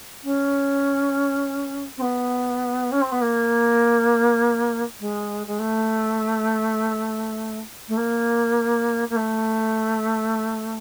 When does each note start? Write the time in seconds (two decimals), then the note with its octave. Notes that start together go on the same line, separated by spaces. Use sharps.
0.24 C#4
1.97 C4
2.02 B3
2.92 C#4
3.01 C4
3.12 B3
3.21 A#3
5.00 G#3
5.47 G#3
5.59 A3
7.88 A3
7.97 A#3
9.09 A#3
9.16 A3